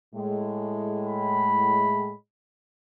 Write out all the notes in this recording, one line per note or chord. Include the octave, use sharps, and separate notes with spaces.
A2 G#3
B5